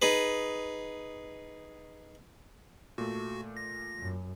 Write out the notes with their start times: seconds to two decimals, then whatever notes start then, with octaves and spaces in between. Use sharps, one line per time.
0.02 D#4 G#4 B4
2.98 A#2 A3 F#4
3.57 A#6
4.00 F#2